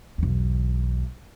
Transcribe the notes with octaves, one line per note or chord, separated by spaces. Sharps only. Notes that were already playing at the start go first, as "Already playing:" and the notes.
B1 E2